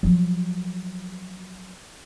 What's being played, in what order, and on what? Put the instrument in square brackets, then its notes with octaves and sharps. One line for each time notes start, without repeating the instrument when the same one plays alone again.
[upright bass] F3 F#3